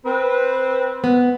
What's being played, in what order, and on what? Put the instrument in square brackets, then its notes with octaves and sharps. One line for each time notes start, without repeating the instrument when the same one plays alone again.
[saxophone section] C4 B4
[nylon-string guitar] B3